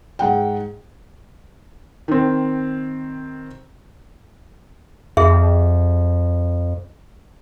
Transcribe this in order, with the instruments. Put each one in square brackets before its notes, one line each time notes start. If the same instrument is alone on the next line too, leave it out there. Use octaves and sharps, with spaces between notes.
[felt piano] G#2 F#5 G5
D#3 C4
[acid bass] F2 [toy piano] G#4 E5